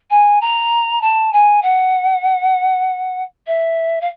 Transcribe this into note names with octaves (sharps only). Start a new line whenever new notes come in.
G#5
A#5
A5
G#5
F#5
E5
F5